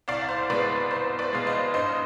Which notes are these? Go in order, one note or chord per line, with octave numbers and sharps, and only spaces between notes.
C2 D5 F5
C5
B2 G#3 B4 D5
C2 C5
B4 D5
B2 G#3 F5
C5 D#5
G2 C5 D#5